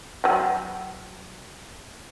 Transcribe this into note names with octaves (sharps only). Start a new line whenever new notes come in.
F#3 G5